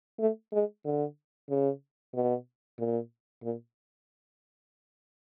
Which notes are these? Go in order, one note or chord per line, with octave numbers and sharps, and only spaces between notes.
A3
G#3
D3
C#3
B2
A#2
A#2